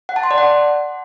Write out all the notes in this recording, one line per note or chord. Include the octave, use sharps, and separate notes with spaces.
F#5
A5
C6
D5
F#5